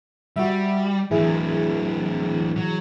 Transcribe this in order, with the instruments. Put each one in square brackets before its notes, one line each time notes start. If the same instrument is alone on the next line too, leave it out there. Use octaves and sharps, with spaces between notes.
[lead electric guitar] G3 [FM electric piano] F#4 E5
[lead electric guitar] A2 F#3 [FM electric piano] E3 E4 G#4
[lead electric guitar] F#3